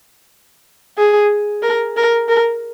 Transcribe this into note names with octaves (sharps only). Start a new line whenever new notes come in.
G#4
A#4
A#4
A#4